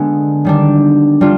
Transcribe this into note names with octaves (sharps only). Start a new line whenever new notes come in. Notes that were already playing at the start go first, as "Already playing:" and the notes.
Already playing: D3 G#3 B3
D#3 G3 D4
G3 D4 F4